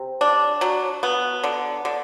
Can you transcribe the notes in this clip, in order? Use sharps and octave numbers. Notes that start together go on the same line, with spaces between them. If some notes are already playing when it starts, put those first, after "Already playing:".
Already playing: C3
D4
F#3
B3
D3
D3